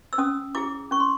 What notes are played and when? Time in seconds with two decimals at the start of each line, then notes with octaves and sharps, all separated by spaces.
0.13 E6
0.18 C#4 D#6
0.55 E4 G#4 D6
0.91 C#4 C#6
1.00 C6